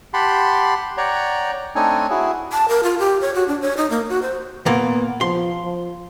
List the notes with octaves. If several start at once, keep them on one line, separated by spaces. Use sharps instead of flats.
G4 F#5 A5 B5 C6
C#5 D5 F#5 G5 A#5
A3 C4 D4 D#4 C#5 G#5
E4 F#4 G#4
A5
A#4
F4
G4
C#5
F#4
D4
C#5
D#4
A#3
F#4
C5
A#2 A#3 B3
F3 C6
F3